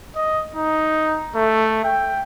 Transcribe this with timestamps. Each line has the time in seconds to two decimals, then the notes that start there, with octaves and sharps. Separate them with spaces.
0.16 D#5
0.55 D#4
1.35 A3
1.85 G5